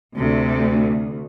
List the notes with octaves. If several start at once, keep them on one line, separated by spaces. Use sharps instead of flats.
D2 C3 A3